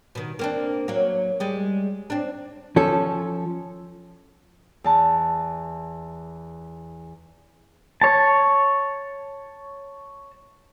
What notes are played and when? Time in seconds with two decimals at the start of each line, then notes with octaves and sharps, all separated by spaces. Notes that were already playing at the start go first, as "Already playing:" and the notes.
0.15 B2 D#3
0.39 A#3 C4 D4
0.88 F#3 A#3
1.40 G3 G#3
2.10 C4 D4
2.76 F3 C#4 A4
4.84 E2 A5
8.01 C#5 A5